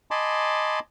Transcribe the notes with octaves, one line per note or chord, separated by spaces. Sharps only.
D#5 G#5 A5 B5 C6 D6